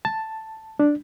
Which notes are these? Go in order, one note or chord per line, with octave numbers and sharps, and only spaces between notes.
A5
D4